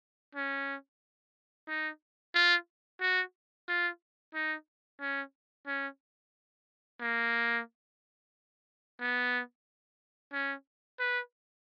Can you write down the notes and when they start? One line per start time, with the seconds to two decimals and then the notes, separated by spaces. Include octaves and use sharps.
0.35 C#4
1.68 D#4
2.34 F4
3.01 F#4
3.68 F4
4.34 D#4
5.01 C#4
5.67 C#4
7.00 A#3
9.00 B3
10.33 C#4
10.99 B4